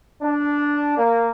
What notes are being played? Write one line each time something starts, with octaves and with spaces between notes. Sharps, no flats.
D4
A#3